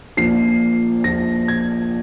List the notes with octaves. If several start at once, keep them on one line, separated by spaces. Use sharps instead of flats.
A#1 A#2 F3 C7
A#1 A#2 F3 A#6
G#6